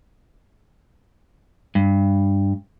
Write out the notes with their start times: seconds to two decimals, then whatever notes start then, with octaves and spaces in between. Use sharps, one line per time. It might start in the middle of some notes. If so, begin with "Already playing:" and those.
1.75 G2